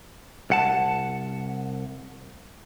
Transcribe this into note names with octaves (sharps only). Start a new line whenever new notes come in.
C2 F#5 A5